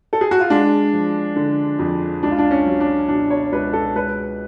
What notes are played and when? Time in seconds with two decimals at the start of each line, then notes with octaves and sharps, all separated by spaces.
0.13 A4
0.21 G#4
0.31 F#4
0.40 F4
0.50 G#3 D4
0.93 F3
1.36 D3
1.79 F2
2.23 C#2 D4
2.31 F4
2.38 D4
2.51 C#4
2.66 F#3
2.80 D4
3.08 B2 D4
3.30 C#5
3.52 C#2 B4
3.73 A4
3.95 G#3 B4